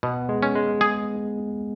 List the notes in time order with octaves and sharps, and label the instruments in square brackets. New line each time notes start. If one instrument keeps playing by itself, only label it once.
[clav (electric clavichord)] B2 [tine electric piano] B3
[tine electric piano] G#3
[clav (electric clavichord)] C#4
[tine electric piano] G#3
[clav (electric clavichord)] G#4